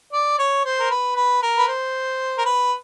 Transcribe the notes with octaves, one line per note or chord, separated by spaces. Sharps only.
D5
C#5
C5
A#4
B4
B4
A#4
B4
C5
A#4
B4